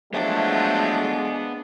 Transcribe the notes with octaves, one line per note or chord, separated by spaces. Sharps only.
F3 F#3 G#3 A3 B3 D4 E5